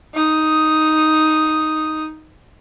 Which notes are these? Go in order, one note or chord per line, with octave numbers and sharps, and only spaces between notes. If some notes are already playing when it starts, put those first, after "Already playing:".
D#4 D#6